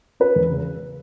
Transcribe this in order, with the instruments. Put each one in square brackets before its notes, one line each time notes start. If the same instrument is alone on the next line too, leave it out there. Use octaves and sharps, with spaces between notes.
[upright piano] C#4 B4
E2
C#3